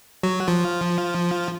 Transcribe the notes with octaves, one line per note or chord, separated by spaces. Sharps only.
F#3 F#4
F3 F4